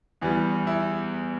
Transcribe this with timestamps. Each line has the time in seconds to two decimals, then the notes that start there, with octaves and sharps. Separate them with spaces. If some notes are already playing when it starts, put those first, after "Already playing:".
0.21 E2 E3 G3
0.67 E4